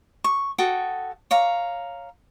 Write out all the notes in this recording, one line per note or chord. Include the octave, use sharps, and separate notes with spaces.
C#6
F#4 A4 G5 D#6
C#5 F5 A#5